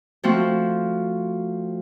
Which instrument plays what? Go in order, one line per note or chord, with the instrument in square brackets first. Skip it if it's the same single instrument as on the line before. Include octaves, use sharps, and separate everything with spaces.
[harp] F3 A3 C4 F#4 F#6